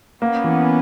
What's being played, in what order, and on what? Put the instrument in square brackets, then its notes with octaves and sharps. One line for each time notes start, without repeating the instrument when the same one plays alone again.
[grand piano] A#3 [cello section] B3 C#4
[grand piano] E3